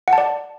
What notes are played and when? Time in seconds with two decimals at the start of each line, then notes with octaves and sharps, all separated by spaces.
0.08 F#5
0.13 A5
0.18 D5